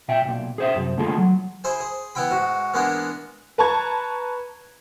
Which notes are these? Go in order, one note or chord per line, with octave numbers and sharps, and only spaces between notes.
A#2 E5 G5
B1 A#2
G#4 C5 E5
C2 F#2
D3 A3 A#3 F4 G#4 A4
F#3
E4 G#4 C5 G#5
G#4
E3 B3 E4 G5 B5
G#2 F#4
E3 G#3 A#3 B3 D4 A#4
B4 A5 A#5 C#6 G#6